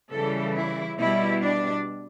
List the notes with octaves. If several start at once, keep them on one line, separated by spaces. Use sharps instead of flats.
C#3 E3 G3 A4
E4
B2 G3 E4
D4